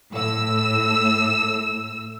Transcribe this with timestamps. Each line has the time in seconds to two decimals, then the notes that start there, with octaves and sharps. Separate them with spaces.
0.11 A2 E6